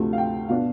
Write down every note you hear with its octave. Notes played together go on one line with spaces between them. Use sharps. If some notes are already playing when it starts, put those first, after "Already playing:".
Already playing: D2 C3 F3 A3
F5
G5
B2 B3 D4 F5